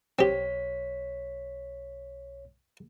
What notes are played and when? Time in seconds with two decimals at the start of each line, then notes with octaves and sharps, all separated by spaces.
0.19 B1 C4 G4 C#5 B6